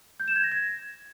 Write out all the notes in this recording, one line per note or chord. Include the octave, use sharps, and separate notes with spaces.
G6
E7
G#6
A#6
G#6